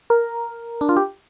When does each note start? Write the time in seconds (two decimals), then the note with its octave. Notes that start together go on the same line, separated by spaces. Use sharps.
0.10 A#4
0.81 D4
0.89 F4
0.97 G4